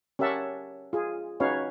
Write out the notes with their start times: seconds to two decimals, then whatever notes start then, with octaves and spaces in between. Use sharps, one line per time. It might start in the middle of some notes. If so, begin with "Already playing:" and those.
0.19 C#4 G4 A#4 E5 F#5 A5
0.93 F4 G#4
1.40 C#4 D#4 F#4 B4 C#5 F5